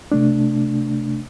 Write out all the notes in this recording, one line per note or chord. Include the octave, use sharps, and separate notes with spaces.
C3 A3 D4